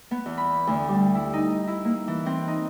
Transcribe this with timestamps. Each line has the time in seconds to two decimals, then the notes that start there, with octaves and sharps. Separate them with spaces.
0.11 B3
0.26 E2
0.37 B5
0.67 D2
0.89 G3
1.15 E4
1.33 D#4
1.67 E4
1.85 A#3
2.08 E3
2.26 C4
2.48 D#4